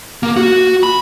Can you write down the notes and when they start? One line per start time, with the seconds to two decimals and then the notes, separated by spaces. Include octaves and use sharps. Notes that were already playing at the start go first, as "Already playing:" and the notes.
0.23 A#3
0.37 F#4
0.83 B5